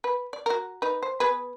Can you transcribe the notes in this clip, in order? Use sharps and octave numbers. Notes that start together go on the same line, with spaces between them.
B4
D5
F#4 A#4
D#4 B4
C5
B3 G#4 B4